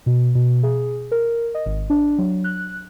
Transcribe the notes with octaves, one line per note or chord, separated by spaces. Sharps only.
B2
B2
G#4
A#4
D#5
G#1
D4
F#3
F#6